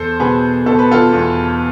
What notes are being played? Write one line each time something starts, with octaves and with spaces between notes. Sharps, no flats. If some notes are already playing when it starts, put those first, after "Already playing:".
Already playing: E2 A4 C5
B2 G#4 B4
B2 A4
B4
F4 A4
E2